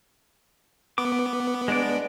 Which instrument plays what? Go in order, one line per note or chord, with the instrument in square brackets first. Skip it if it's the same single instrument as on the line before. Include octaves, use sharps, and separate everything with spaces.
[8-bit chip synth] B3 [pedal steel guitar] D6
[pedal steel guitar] G#3 D4 D5